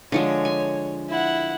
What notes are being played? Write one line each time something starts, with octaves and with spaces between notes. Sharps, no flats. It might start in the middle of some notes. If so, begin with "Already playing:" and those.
D3 F3 G#3 C#5
G#5
E4 F#5